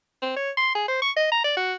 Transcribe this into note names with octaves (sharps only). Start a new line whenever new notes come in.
C4
C#5
C6
G#4
C5
C#6
D#5
A#5
D5
F#4